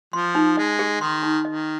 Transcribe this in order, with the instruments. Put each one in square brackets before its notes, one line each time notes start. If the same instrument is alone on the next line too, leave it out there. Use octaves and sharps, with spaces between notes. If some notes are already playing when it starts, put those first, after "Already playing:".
[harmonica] F3 [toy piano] C6
[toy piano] D#4
[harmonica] G#3 [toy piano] D#5
[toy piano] G#4
[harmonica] D#3 [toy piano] C6
[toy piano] D#4
[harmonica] D#3 [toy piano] D#5